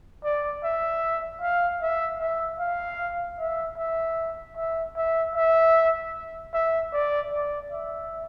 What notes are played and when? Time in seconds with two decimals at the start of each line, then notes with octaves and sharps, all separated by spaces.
0.24 D5
0.64 E5
1.42 F5
1.82 E5
2.21 E5
2.60 F5
3.39 E5
3.78 E5
4.57 E5
4.96 E5
5.36 E5
6.54 E5
6.93 D5
7.33 D5
7.72 E5